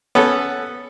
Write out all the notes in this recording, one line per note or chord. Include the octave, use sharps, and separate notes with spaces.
B3 C#4 A4